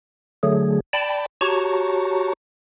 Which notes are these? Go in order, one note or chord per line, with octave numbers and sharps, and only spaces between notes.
D3 F#3 A3 G#4
D5 G5 A5 B5
F#4 G4 C#5 A5 A#5 C#6